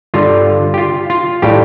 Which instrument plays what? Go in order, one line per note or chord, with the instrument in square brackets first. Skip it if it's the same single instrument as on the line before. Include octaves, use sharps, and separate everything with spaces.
[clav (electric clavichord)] G2 D3 G3 F4
G4
F4
F4
A2 G3 G4